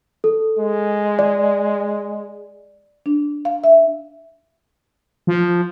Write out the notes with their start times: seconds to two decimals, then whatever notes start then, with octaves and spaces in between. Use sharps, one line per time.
0.24 A4
0.59 G#3
1.19 D5
3.06 D4
3.45 F5
3.64 E5
5.27 F3